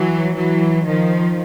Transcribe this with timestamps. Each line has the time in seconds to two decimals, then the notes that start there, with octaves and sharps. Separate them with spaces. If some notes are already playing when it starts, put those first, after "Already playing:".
Already playing: E3 F#3
0.35 E3 F#3
0.86 D#3 F3